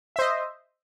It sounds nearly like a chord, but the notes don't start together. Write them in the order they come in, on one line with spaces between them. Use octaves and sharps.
E5 C5 D#5